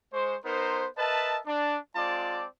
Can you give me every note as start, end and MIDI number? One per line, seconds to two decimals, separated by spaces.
0.13 0.36 56
0.13 0.36 72
0.13 0.36 85
0.45 0.87 59
0.45 0.87 63
0.45 0.87 70
0.45 0.87 72
0.98 1.39 70
0.98 1.39 71
0.98 1.39 75
0.98 1.39 76
0.98 1.39 81
1.46 1.78 62
1.96 2.46 56
1.96 2.46 60
1.96 2.46 65
1.96 2.46 74
1.96 2.46 81
1.96 2.46 86